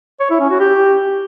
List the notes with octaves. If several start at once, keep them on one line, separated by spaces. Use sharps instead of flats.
C#5
E4
C#4
F#4
G4